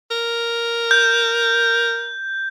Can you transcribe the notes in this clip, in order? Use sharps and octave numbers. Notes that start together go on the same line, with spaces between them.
A#4
G6